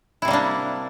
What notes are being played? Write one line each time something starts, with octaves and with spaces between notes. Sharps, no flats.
C3 G3 A#3 D4 E4